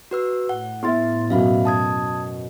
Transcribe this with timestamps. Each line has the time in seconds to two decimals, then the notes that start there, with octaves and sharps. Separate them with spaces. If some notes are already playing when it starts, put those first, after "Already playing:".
0.11 F#4 B4 E6
0.49 A2 F#5
0.83 B3 E4 E5 C6 A6
1.30 F#2 B2 E5 F5 B5
1.65 A5 D#6 G#6